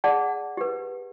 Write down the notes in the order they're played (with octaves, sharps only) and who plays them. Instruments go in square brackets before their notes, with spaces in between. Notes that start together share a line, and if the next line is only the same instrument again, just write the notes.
[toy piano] G#4 D5 F#5 A5
G4 B4